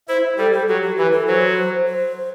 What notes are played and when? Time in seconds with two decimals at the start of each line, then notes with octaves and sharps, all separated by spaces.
0.08 E4 C5
0.37 G3 A4
0.52 A4
0.68 F#3 G4
0.83 G4
0.97 E3 B4
1.12 A4
1.27 F#3 C5
1.88 C5